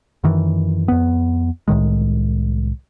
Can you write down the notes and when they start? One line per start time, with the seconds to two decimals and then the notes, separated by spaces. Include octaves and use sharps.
0.24 F#2 D#3 E3
0.88 F2 B3
1.68 C2 A2 D#3 G#3